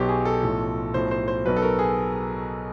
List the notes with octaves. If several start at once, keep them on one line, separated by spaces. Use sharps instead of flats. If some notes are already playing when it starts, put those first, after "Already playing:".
Already playing: B1 B2 F#3 G4
G#4
A4
B1 A2 F3
B1 A2 F3 C5
C5
C5
B1 B2 F#3 B4
A4
A#4
G#4